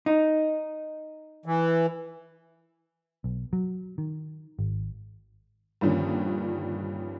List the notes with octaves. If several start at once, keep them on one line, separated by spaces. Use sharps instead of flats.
D#4
E3
B1
F#3
D#3
G#1
G2 A#2 D3 D#3 F3 C#4